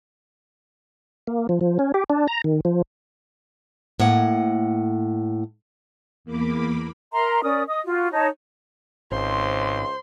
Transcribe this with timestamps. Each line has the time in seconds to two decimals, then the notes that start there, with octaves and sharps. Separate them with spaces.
1.27 A#3
1.49 F3
1.61 F3
1.79 C#4
1.94 G4
2.10 D4
2.28 A#5
2.44 D#3
2.65 F3
4.00 A2 A#3 F#5
6.25 E2 A#3 B5 D6
7.13 A#4 E5 A#5 C6
7.43 C#4 A#4 D5 D#6
7.68 D#5 D#6
7.84 F4 F#4
8.12 D#4 C#5 A5
9.12 G#1 C#2 C5 C6